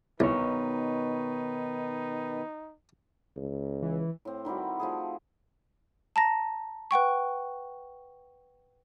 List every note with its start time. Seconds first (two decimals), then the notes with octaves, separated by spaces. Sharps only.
0.20 C2 B2 D#3 D#4 B4 C#5
3.36 C#2
3.83 E3
4.25 A2 C4
4.45 D#3 G3 E4 F#4
4.80 F3 A3 G#4
6.16 A5 A#5 A#6
6.91 B4 F#5 G5 C#6